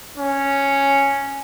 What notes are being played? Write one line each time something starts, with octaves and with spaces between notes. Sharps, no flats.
C#4